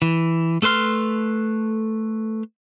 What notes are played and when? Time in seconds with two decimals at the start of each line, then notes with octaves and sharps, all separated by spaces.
0.02 E3
0.62 A3 A4 B4 C6 F6